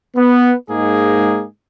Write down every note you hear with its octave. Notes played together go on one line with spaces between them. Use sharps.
B3
G#2 G#3 A#3 D#4 G#4